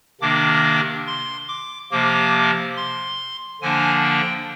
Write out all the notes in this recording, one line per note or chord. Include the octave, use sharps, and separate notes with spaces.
C3 D#3 A#3 D4 D6
C6
D6
C3 F3 A#3 D6
C6
D3 F3 A#3 D4 G#5
G5